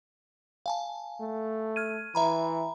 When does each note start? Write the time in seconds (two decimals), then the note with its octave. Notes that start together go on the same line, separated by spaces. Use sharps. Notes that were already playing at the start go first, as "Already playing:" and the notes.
0.66 F5 G#5 A5
1.20 A3
1.76 F6 G#6 D#7
2.15 E3 E5 A#5 B5